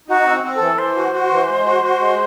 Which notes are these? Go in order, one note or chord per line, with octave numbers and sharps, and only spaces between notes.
D#4 F#4
C4
C4
A4
E3
E3 C5
F#4
F#4
E3
G#3
F#4
F#4
G#3